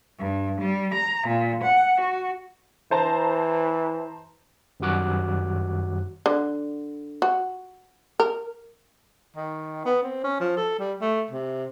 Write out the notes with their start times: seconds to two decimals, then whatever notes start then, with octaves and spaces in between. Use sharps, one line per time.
0.19 G2
0.61 G3
0.94 A#5
1.28 A#2
1.63 F#5
2.00 F#4
2.91 E3 C5 A5 A#5
4.80 F#2 D#3 G3 F#4 D6 F#6
6.26 D3
7.22 F#4
8.20 A#4
9.36 D#3
9.85 B3
10.03 C4
10.24 C#4
10.40 F3
10.57 A4
10.79 G3
11.01 A3
11.30 C3